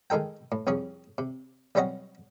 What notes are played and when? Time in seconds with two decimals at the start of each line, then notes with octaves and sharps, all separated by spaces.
0.10 D#3 G#3 D#4 A4 G5
0.52 A2
0.67 C2 F2 C#4 G#4
1.18 C3
1.75 B1 G3 C4 C#4 D#5 F#5